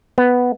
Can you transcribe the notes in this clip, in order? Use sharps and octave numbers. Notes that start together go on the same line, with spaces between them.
B3